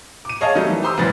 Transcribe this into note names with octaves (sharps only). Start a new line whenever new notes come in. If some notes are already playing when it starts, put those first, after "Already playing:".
D6 D#7
G#4 C#5 D#5 F5 A5
D#3 F#3 G3 A3 D#4
E3
G4 C5 C6 D#6 E6
F#1 G#2 E3 C4 B4 A6